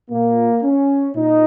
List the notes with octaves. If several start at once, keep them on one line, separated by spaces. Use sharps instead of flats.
A#2 A#3
C#4
A#2 D#4